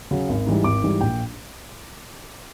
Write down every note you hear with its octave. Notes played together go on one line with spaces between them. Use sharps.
C#3 F#3
G#1
G#2 E3 G3
G#1 D6
G#2 E3 G3
A#1 G5